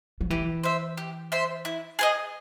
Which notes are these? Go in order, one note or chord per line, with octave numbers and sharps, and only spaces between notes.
F3
E3 G4
C5 E5
G4
C5 E5
E4
G#4 C5 D#5